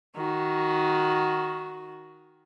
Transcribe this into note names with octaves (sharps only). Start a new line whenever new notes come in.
D#3 F#4